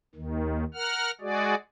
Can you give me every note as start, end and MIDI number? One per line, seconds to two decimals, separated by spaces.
0.15 0.64 39
0.15 0.64 51
0.74 1.11 70
0.74 1.11 78
0.74 1.11 89
1.21 1.55 56
1.21 1.55 66
1.21 1.55 68
1.21 1.55 74